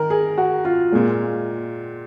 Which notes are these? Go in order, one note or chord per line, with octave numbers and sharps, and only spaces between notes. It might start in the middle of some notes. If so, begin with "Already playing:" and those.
Already playing: D#3 A#4
G#4
F#4
F4
A#2 G#3